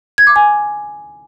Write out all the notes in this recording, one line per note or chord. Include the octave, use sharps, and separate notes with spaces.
G#6
D6
G#5